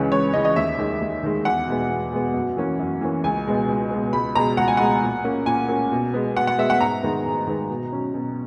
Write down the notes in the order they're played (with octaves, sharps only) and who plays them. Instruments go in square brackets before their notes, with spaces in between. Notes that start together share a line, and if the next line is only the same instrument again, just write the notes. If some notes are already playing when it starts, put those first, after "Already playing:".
Already playing: [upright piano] C#2 C#3 E3 G#3 C#4 B4
C#2 C#5
C#3 E3 G#3 C#4 D#5
D#5
D#2 E5
D#3 G#3
D#2
D#3 G#3
E2 F#5
B2 G#3 B3
E2
B2 G#3 B3
F#2
E3 A#3 C#4
F#2
E3 A#3 C#4
C#2 G#5
B2 G#3 B3
C#2
B2 G#3 B3
C#2 B5
B2 G#3 A#5
C#2 F#5
G#5
B2 G#3 F#5
A#2
A#3 C#4
A#2 G#5
A#3 C#4
B2
G#3 B3
B2 F#5
F#5
G#3 B3 E5
F#5
G#2 A#5
D#3 G#3 B3
G#2
D#3 G#3 B3
B2
F#3 C#4
B2